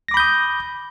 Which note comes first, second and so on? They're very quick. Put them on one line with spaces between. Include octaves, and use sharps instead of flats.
A#6 D6 B5 G6 D#6